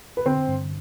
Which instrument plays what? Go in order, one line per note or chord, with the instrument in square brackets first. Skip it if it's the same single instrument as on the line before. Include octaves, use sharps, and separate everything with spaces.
[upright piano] B4
[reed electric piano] D3 [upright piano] C4 C5
[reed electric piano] G2